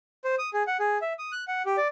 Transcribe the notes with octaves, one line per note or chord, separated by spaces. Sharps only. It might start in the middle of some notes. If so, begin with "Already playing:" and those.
C5
D#6
G#4
F#5
G#4
E5
D#6
F#6
F#5
G4
D5